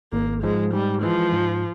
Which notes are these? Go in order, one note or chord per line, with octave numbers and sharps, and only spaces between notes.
G#1 A#3
G#2 F3 G#3
G#2 G3
E3 F3 G#3
G#2